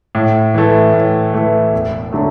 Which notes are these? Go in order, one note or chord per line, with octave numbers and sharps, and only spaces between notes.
A2
E3 A3
A2
E3 A3
E1
D3 F#3 A3